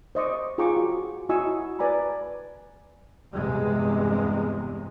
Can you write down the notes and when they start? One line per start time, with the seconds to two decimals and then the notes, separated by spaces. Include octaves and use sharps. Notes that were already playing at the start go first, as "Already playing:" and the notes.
0.15 C5 D#5 C#6 D6
0.58 F4 G#4 G5 A#5 C#6 D6
0.77 F#4
1.29 E4 F#4 D#5 G#5 C#6 E6
1.79 B4 D5 G#5 A#5 B5
3.31 E2 G2 C3 G#3